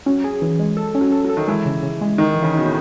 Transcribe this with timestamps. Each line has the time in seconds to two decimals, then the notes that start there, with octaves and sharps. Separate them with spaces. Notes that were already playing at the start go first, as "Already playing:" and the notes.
0.06 F#3 C#4
0.24 G#4
0.42 E3
0.59 G#3
0.77 A4
0.95 C#4
1.01 F#3
1.12 A4
1.24 F#3
1.29 A4
1.37 D#3
1.48 E3 G#3
1.66 C#3
1.83 C#3
2.01 G#3
2.18 D#3 D#4
2.36 E3
2.42 C#3
2.54 B2 D#4
2.66 A2